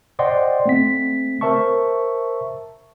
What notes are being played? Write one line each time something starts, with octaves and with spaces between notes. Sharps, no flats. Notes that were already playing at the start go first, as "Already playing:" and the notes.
C5 D5 D#5 F#5 G5 C6
A3 C4 B6
A#4 C5 E5 A5 C#6